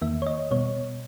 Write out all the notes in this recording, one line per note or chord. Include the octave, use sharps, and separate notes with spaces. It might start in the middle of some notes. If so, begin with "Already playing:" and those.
E2 D#3 A#3 E5
C#5
D#5
B2 G3 B3 C#5